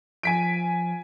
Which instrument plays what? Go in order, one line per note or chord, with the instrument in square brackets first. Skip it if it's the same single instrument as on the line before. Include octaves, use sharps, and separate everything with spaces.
[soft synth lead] F3 [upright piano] G#5 B6 D7